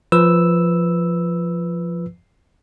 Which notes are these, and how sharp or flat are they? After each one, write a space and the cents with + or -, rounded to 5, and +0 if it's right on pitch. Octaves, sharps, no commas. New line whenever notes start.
F3 -10 B4 +0 E6 +0